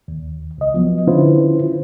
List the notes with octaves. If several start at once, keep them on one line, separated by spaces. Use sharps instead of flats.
D#2
C#2 D#5
F3 F#3 B3
D3 C#4 E4 F4 B4 C5